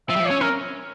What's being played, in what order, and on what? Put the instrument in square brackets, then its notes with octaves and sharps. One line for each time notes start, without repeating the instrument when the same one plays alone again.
[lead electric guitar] F3 [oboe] E5
[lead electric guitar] G3
F3
[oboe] C#5
[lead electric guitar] C#4
[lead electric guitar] C#4 [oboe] A#4